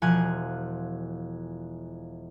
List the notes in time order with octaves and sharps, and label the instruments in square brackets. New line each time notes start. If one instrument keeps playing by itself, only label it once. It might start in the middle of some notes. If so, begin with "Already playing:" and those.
[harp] E1 F3 F4 G#5 F#6 G#6